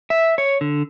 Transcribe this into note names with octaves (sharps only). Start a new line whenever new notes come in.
E5
C#5
D3